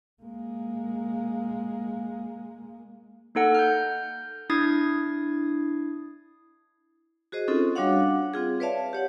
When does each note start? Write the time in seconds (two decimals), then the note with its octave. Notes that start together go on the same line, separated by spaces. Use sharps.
0.23 G#3 A#3
3.35 A#3 D#4 A4 F#5
3.55 F6 G6
4.50 D4 E4 D#6 G#6 A6 C7
7.32 F#4 G#4 C5 D#5
7.48 C4 C#4 D#4 F4 A4
7.75 G3 D4 F#4 C#5 F5 F#5
8.33 C4 F4 G#4
8.60 B4 C#5 D5 E5 F5 A5
8.93 G4 C#5 F#5